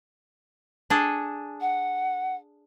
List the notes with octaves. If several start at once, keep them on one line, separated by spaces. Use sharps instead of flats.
D4 G#4 A4
F#5